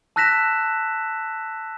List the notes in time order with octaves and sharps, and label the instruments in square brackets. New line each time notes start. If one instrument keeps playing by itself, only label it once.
[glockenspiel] A5 E6 F#6 A#6 B6 E7